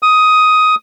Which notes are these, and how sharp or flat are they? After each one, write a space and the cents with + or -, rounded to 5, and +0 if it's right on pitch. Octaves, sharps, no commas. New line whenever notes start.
D#6 +10